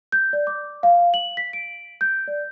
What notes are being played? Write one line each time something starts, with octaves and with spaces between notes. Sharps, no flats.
G6
D5
D6
F5
F#7
B6
D7
G6
D5